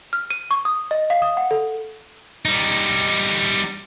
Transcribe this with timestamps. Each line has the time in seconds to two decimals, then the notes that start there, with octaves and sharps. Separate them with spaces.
0.13 F6
0.30 D#7
0.51 C#6
0.65 D#6
0.91 D#5
1.10 F5
1.22 D#6
1.37 F#5
1.51 A4
2.45 G3 D#4